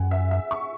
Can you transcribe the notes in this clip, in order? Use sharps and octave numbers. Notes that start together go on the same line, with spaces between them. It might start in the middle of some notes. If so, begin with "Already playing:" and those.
Already playing: F#2 F#5 G#5
E5
E5
C#6